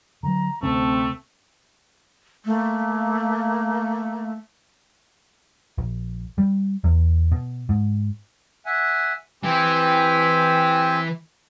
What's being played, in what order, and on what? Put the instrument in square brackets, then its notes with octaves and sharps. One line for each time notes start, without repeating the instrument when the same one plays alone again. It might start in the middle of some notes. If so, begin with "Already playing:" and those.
[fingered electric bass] D3 F#3 [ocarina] A#5
[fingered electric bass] D2 C3 C#4 [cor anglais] A3 [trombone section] C4 [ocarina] A5
[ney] A3 [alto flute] A#3
[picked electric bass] A#1
G3
E2
B2
G#2
[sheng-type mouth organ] E5 F#5 G#5
[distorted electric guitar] E3 [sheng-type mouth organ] C4 G4 G#5